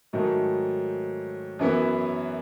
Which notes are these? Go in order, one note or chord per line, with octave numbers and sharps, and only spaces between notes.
G#2 D#3 F#3 A3 D#4
F#2 E3 B3 E4